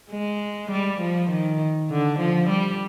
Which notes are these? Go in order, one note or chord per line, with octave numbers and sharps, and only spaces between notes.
G#3
G3
F3
D#3
D3
F3
G3